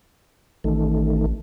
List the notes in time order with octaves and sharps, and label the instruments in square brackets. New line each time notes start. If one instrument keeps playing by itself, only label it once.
[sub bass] A1 [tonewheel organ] D#3 A3